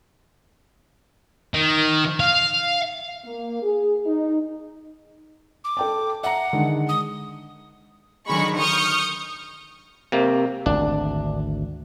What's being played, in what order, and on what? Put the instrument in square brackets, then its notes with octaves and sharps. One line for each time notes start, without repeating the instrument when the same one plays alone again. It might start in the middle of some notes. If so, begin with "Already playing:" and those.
[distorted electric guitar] D#3
F5
[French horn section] A#3
G#4
D#4
[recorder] D6
[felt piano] A4 G5 A5
[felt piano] E5 A#5 [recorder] F#5
[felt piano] D3 D#3 G#3
[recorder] D#6
[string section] D3 D#3 F#3 G#3 B5 C#6
C#6 D#6 F6 G6
[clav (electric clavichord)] C3 A#3
[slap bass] G#1 D2 [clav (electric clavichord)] D4